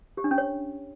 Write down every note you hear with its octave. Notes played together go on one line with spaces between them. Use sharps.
G4
D4
C#4
C#5